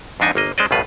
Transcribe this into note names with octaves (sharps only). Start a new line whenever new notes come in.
F2 G#2 D4 D#4 G#5
G1 A#3 D#5
G#3 C#4 C5 D5 D#5
A#1 G2 B2 F4 B4